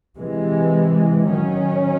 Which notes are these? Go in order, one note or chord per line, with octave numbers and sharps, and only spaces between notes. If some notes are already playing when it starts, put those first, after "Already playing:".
C3 E3 G#3
D#3 F#3 C#4